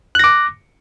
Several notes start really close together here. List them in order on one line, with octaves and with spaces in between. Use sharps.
F#6 A#6 D6